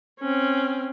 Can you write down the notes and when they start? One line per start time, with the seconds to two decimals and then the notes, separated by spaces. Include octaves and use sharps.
0.20 C4 C#4